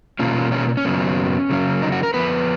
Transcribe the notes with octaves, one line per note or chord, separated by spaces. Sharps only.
B2 A#3 C#4 F4
C#4
C#4
F#2 C#3 F#3 B3
C#3 F#3 A#3 C#4
D#4
F#4
A#4
F2 F3 B3 B4